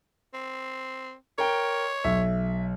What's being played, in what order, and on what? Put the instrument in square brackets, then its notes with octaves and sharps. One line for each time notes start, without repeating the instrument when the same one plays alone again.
[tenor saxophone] C4
[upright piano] A#4 G5 [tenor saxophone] C#5
[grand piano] B1 [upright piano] E5